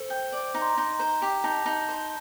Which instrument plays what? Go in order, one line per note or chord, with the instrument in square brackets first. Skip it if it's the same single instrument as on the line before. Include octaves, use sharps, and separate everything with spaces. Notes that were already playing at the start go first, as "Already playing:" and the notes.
Already playing: [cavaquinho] A4 [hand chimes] C5
[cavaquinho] G5
D5
[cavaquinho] D#4 [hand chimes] A#5
[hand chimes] C6
A#5
[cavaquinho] D#4
[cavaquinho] C5 [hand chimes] A#5
[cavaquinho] G4
[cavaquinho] D#4 [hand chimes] A5
[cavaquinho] D#4
C5